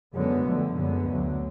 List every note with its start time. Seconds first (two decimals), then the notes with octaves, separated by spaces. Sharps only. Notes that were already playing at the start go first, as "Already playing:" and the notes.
0.14 F#2 D3 G#3 B3
0.45 D2 D3 F3
0.75 F#2 D3 G#3 B3
1.07 D2 D3 F#3